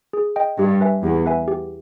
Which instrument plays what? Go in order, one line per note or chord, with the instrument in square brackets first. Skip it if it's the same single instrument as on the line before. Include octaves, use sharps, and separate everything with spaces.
[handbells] G#4
D#5 G5
[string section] G2 [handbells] G4
[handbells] B4 E5 G#5
[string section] E2 [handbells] G4
[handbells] B4 E5 G#5
G4